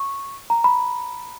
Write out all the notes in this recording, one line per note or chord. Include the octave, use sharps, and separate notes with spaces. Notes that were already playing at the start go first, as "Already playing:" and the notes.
Already playing: C#6
A#5
B5